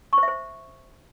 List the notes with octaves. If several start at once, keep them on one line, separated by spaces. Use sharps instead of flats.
C#6
C5
E5
C5